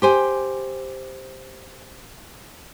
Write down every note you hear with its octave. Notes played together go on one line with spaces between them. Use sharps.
G4 C5 G#5